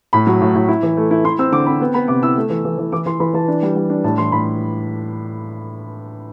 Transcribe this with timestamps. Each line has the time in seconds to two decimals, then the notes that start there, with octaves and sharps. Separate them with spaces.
0.13 A2 B5
0.27 F#3
0.41 A2
0.55 A2
0.68 E4
0.83 E3
0.97 A3
1.11 E4
1.25 E4 C6
1.38 C4 E6
1.52 D3 D6
1.66 C4 B5
1.81 B3
1.94 B3 B5
2.08 C3 D6
2.23 E4 E6
2.37 A3
2.50 E3
2.65 E3
2.78 E3
2.92 E3 D6
3.06 E3 C6
3.20 E3 B5
3.34 E3 A5
3.48 D4
3.62 G3
3.76 G3
3.90 D4
4.04 A2 A5
4.18 E3 C6
4.32 A2 B5